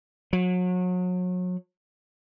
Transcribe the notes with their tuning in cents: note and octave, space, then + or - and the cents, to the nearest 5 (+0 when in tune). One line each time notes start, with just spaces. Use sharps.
F#3 -35